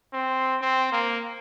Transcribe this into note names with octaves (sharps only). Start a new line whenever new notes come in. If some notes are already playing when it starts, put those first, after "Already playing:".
C4
C4
A#3